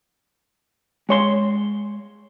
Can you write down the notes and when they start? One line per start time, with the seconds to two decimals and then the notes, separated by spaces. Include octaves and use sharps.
1.09 G#3 C#5 C6